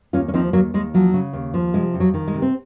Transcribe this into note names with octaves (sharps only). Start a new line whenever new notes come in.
D#2 C#4 F4
C#4
F3 C4 D#4
D#2 F#3 A#3
D#2 G#3
F3 F#3
C#3
D#2
F3
C3 G#3
F2
F#3
D#3
G#3
C3
C4